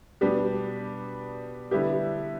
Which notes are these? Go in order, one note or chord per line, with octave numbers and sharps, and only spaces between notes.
B2 G3 B3 D4 G4
D3 G3 B3 E4 G4